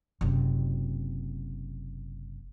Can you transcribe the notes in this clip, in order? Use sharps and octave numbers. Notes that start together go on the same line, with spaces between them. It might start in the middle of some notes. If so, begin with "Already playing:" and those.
F#1 C3